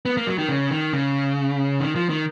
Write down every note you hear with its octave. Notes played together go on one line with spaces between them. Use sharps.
B3
A#3
F#3
D#3
C#3
D#3
C#3
D#3
F3
D#3